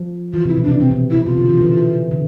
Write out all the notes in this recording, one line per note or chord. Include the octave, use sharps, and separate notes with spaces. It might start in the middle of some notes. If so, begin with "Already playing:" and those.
Already playing: F3
E3 F4
C3 E4
B2
C3 D4
B2 C4
B2
B2 E4
C3 F4
D3
E3
E3
D3